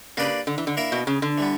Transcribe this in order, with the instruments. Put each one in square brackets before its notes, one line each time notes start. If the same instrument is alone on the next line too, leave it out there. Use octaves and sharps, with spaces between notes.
[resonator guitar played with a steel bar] C#3 [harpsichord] A#3 D4 G4 B4 D5
[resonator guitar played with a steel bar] D3
E3
D3
[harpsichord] A#3 E4 A#4 E5
[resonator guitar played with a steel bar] B2
C#3
D3
[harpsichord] E3 G3 B3